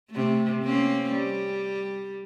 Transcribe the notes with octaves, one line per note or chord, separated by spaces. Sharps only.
C3 A3
A#3 C4 C#4
G3